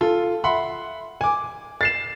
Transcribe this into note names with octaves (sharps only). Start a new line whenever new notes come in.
F4 A4
E5 F#5 B5 C6
G#5 D6
A6 C7 E7